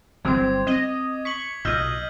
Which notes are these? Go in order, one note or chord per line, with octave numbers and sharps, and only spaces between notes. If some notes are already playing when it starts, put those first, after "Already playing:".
G1 F#3 G3 C4 D6 G#6
C4 D#5
C#6 B6 F#7
B1 A#2 D#5 E6 F6 G6